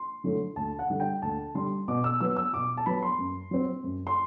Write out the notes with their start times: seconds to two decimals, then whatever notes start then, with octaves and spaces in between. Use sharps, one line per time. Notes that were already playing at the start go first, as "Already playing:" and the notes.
Already playing: C6
0.24 D3 F#3 A3 E4
0.56 D2 A5
0.79 F#5
0.90 D3 G3
1.00 G5
1.22 D2 A5
1.54 D3 G3 C6
1.88 B2 D6
2.04 E6
2.20 F#3 B3 E6
2.36 E6
2.53 B2 D6
2.77 A5
2.86 F#3 B3 B5
3.02 C6
3.18 F#2
3.51 F#3 C4
3.84 F#2
4.07 C6